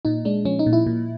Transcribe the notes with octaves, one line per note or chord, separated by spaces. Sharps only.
A#2 D#4
G#3 D4
F3 C#4
D#4
A#2
E4
A#2